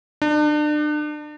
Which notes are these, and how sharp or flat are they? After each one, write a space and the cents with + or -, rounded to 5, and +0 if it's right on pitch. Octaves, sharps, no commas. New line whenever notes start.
D4 +35